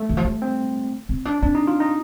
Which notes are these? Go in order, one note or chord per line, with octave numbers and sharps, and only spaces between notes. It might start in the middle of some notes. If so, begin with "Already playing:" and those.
Already playing: A3
D#3
F3
G3
C4
C4
D4
C4 D4
D#4
F4
D#4